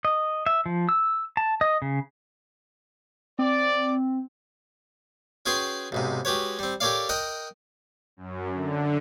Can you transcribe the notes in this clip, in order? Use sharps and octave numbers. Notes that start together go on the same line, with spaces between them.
D#5
E5
F3
E6
A5
D#5
C#3
C4 D5
C#4 F#4 G#4 B4 G5 C6
B1 G#2 C3
G#3 F#4 G4 B4 C#5
G3 C4
G4 A4 A#4 C#5 D5 F5
A#4 D#5 F#5 G5
F#2
D3